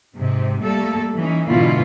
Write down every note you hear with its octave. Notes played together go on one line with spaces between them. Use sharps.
G#2 C3 C4
G3 A3 A#3 A4
E3 C#4 D#4
G#2 B2 D3 E3 E4 F4